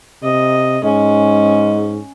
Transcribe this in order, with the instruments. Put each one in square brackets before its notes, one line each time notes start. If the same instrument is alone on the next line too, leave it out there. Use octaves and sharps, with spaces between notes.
[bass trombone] C3 [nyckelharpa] D#5
[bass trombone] G#2 [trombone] G#3 [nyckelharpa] C#4